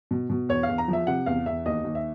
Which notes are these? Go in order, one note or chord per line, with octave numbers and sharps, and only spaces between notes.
B2
B2
E2 C#5
F5
E2
A#5
F3
E5
C3 F#5
E2 F5
E2 E5
D#2 D#5
D#2
E5